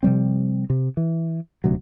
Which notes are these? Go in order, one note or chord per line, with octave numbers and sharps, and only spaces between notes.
C3 F3 G3 C4
C3
E3
D#1 D2 C3 F#3